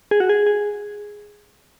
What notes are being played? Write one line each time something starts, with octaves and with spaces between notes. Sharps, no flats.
G#4
F#4
G#4
G#4